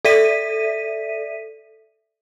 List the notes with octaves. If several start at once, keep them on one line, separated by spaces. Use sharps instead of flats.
A4 D5 E5 B6 D#7